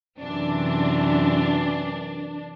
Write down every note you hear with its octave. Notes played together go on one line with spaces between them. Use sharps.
F#2 C3 E3 D4